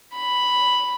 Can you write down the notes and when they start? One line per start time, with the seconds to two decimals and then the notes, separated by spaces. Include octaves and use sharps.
0.14 B5